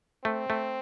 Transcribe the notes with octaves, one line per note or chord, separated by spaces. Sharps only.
A3 C4
A3